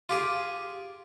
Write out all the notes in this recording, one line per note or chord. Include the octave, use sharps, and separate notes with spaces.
F4 G4 G#4